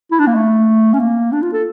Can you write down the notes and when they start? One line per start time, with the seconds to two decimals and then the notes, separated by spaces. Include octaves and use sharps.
0.11 E4
0.19 D4
0.27 A#3
0.35 A3
0.94 C#4
0.99 A#3
1.32 D4
1.42 F4
1.53 A4